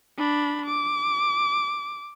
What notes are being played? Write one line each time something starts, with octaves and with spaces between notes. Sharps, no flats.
D4 B5
D6